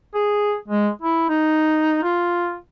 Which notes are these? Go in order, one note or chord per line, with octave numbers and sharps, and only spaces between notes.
G#4
G#3
E4
D#4
F4